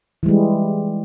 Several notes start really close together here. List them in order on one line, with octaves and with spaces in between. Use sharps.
E3 G3 G#3